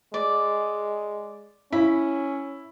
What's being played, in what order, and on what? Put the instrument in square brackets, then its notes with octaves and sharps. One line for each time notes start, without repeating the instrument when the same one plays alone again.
[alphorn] G#3 [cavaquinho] D5
[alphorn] C#4 [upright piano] E4 [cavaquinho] B5